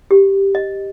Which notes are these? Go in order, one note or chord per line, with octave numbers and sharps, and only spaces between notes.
G4
D#5